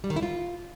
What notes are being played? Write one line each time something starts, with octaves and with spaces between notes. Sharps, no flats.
G3
D#3
E4
F4